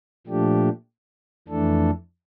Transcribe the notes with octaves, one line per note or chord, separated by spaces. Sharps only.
A#2 F3 A3 D4 G4
F2 E3 A3 D4 A4